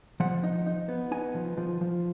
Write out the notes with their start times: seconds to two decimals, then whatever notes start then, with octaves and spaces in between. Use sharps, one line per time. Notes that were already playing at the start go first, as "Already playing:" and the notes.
0.20 F3 F#5
0.43 D#4
0.66 D#4
0.89 B3
1.11 D#4 G#5
1.35 F3
1.57 F3
1.81 F3